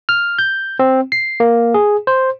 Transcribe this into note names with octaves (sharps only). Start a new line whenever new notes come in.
F6
G6
C4
C7
A#3
G#4
C5